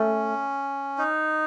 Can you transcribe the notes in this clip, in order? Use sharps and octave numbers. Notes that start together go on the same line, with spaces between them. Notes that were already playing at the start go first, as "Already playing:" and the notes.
Already playing: A3 C#4
D#4